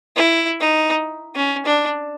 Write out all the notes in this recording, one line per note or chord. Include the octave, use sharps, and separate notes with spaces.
E4
D#4
C#4
D4